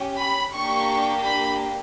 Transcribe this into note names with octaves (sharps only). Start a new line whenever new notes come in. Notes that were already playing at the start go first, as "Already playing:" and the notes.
Already playing: C#4 G4
B5
A#3 D4 G4 C#6
B5